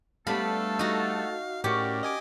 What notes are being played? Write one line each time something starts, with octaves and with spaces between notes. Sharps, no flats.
G3 A3 B3 D4 A4 F5 B5
D#4 F#4
A2 C#4 F#4 G4 A#4 D5
D#5 G#5 D6